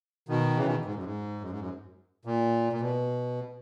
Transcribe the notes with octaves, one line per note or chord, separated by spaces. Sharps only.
B2 D#3
C#3 E3
B2 D#3
G#2
F#2
G#2
F#2
G#2
F#2
A#2
A#2
B2